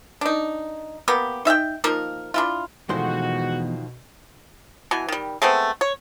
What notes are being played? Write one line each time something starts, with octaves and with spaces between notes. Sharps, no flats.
D4 D#4
A#3 B3 G4
D#4 E5 F5 G5
F3 A#3 D#4 A#4
D4 E4 F4
E2 B2 D#3 F3 G#3 A3 F#4 C5
B2 E3 G#5
D#3 G3
G#3 A3 B3 C4
C#5